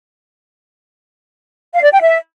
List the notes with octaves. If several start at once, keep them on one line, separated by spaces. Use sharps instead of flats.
F5
D5
G5
E5